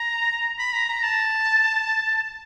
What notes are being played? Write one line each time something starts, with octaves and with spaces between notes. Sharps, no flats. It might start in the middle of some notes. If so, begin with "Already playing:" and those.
Already playing: A#5
B5
A#5
A#5
A5